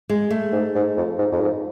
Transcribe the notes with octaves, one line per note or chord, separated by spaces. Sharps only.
G#3
A3
G#2
G#2
F2
G#2
F2
G#2